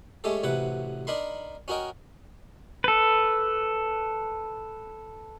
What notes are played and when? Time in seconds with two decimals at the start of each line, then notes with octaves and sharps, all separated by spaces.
0.24 G#3 A3 C#4 G4 A4
0.43 A1 C3 F#3 B4 F#5
1.07 D4 D#4 A#4 B5 C6
1.68 C#4 F#4 A#4 D#5 G5
2.84 A4 B4